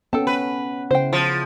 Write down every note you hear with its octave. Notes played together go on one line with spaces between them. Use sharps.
B3 C#4 A4 G5 A5
B4
C#3 E4 C5 G5
F3 F4